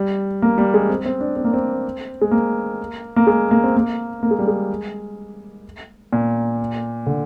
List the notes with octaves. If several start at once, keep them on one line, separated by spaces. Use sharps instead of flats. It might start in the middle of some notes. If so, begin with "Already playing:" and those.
Already playing: G3
A#3
G3
G#3
C4
C4
D4
C4
A#3
C4
G#3
A#3
A#3
G#3
A#3
C4
A#3
A#3
G#3
G3
G#3
A#2
D3